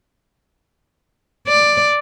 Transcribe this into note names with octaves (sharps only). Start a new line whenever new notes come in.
D5